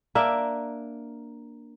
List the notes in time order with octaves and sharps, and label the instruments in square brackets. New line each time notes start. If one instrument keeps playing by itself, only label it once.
[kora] A#3 D4 E5